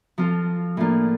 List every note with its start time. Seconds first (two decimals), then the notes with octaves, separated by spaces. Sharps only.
0.18 F3 C4 F4 A4
0.77 A2 F3 A#3 D4 F4